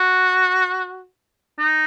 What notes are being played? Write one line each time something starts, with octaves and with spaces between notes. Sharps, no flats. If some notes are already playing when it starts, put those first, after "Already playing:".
Already playing: F#4
D#4